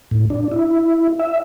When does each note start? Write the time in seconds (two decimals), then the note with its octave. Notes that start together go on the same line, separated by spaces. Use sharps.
0.11 A2
0.30 D4
0.52 E4
1.19 E5